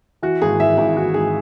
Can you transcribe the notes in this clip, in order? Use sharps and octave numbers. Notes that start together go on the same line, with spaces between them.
E3 F#4
G#1 G#4
E3 E5
G#1 E4
E3 F#4
G#2 G#4